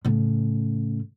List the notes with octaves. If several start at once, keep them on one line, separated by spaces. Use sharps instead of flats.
A2 C#3